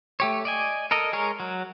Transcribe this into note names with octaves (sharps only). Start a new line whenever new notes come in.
A3 G4 C#5
D5 D#5 G#5
A4 A#4 D#5
G#3 G#4 A#4 C#5
F#3